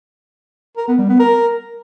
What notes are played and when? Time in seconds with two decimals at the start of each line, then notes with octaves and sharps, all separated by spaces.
0.77 A#4
0.88 B3
0.98 G3
1.09 B3
1.19 A#4